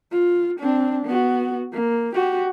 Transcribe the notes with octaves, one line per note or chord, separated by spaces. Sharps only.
F4
C4 D4
B3 F#4
A#3
F#4 G4